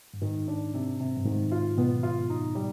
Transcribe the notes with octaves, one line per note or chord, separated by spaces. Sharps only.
G2
G#2 D#3
D4
C3
C3
G2
G#2 D#3
F4
B2 B3
F4
D#4
G3